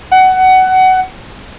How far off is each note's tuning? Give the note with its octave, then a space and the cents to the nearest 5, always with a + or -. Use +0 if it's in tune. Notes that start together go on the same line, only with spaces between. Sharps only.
F#5 +20